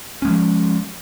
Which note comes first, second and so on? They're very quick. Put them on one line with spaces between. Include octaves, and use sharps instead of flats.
C#4 G#3 F3